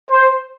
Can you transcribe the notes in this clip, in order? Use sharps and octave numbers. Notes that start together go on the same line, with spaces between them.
C5